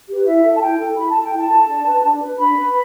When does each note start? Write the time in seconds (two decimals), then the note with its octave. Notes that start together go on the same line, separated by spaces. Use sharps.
0.08 G4 B4
0.26 E4 E5
0.44 A4
0.56 A5
0.62 E4 G5
0.79 A4
0.97 E4 B5
1.11 A4 A5
1.24 G5
1.33 E4
1.38 A5
1.50 A4
1.68 D4
1.86 B4
2.03 D4
2.21 B4
2.39 D4 B5
2.57 B4